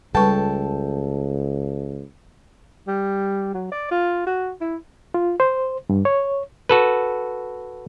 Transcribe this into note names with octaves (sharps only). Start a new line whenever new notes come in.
C#2 G3 A4 B4 G5 A5 C#6
G3
F#3
D5
F4
F#4
E4
F4
C5
G2
C#5
F#4 A4 B4